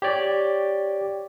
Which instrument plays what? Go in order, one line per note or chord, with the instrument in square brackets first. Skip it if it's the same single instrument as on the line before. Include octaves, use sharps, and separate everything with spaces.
[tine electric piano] G4 C#5 D5